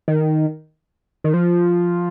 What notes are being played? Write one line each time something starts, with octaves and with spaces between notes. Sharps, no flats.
D#3
D#3
F3